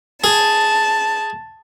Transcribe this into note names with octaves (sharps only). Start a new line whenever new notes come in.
G#4 A5